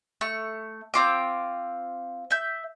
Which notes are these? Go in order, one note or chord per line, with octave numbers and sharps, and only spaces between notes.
A3 C#6
C4 F4 D6
E5 G6